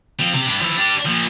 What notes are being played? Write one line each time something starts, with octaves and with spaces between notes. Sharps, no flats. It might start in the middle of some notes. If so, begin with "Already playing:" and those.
F3 C4
C3
G2 D4
F3 E4
D4 G4
A#2 F3